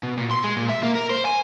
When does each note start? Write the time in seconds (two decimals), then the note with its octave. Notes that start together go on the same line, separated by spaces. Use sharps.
0.03 B2
0.17 A#2
0.31 C6
0.44 G#3
0.57 A#2
0.69 E5
0.83 A#3
0.95 A#4
1.10 C5
1.25 G#5